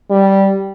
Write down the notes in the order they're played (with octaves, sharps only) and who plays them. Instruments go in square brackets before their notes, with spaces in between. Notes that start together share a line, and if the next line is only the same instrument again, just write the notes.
[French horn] G3